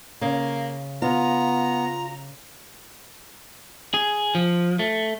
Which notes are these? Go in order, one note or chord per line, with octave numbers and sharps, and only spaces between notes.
C#3 A#3
B3 F4 A#5
G#4
F3
A3